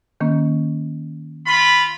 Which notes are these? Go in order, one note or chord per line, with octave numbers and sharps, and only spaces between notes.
D#3 A#3 C#4
F4 B5